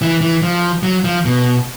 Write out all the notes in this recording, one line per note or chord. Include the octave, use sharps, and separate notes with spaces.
E3
E3
F3
F#3
F3
B2